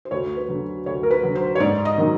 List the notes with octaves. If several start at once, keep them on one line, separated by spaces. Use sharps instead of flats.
C5
D2 C#5
B4
D3 F#3
D2 C#5
A#4
B4
D3 F#3
C5
C#5
G#2 D5
D#5
D#3 F#3